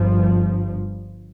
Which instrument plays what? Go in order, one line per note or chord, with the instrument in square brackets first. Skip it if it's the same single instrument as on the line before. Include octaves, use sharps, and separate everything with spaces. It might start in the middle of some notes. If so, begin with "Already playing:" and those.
Already playing: [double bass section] G1 G2 F3